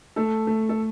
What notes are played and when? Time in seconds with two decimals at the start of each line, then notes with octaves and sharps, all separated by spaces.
0.16 A3 A4
0.47 A3
0.69 A4